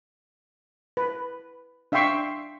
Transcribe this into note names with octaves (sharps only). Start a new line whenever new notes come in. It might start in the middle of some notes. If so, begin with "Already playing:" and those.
B4
D4 E5 F5 G5 C6 C#6